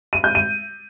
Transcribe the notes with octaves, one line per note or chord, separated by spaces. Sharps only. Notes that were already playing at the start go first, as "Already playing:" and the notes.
D#7
G6
D#7